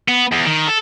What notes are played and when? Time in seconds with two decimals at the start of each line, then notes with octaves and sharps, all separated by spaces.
0.08 B3
0.32 E2
0.45 D#3
0.67 A4